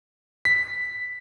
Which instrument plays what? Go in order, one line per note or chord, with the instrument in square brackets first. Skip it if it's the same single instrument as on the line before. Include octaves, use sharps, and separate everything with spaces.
[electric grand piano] B6